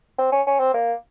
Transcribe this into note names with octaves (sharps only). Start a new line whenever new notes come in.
C4
C#4
C#4
C4
A#3